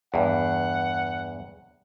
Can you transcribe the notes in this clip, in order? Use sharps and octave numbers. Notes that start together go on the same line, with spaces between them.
E2 G2 F#5